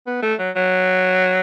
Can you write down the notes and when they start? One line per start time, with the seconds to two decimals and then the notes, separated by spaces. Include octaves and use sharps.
0.07 B3
0.22 A3
0.39 F#3
0.56 F#3